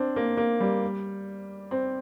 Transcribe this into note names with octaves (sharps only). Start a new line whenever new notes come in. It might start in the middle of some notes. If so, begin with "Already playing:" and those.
Already playing: C4 D4
A#3
A#3
G3
C4